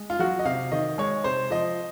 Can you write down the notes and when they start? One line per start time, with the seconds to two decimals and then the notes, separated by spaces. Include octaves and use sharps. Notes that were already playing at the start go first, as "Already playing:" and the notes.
Already playing: G#3
0.10 F4
0.19 F#3 F#4
0.39 D#5
0.45 C3 F5
0.72 D#3 D#5
0.98 G#3 C#5
1.24 C3 C5
1.51 F3 D#5